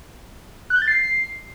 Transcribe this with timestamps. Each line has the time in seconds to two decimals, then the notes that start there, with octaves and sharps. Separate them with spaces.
0.70 F#6
0.76 G6
0.82 A6
0.88 C7